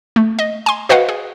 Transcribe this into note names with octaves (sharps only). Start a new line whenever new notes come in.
A3
D#5
G#5 C6
F#4 B4 C5 D#5 F5 F#5
G#4